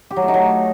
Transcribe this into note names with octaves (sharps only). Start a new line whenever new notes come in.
G4
F#3
A3
D#4
F#3